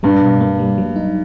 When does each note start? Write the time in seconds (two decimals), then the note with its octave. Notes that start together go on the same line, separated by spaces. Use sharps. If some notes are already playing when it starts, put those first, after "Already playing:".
0.03 G2 G3
0.21 B2
0.41 A#3
0.59 G3
0.78 F#3
0.96 D#4